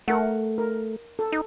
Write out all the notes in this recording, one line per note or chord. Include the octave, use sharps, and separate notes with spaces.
A3 A#4 F#5
A#4
A4
D#4